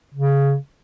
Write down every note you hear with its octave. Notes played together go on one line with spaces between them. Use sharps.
C#3